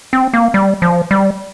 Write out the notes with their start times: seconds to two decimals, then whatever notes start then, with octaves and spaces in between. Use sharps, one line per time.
0.13 C4
0.33 A#3
0.54 G3
0.82 F3
1.11 G3